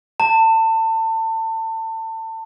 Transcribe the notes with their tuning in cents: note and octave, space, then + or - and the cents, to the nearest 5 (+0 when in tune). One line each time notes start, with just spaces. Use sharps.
A5 +30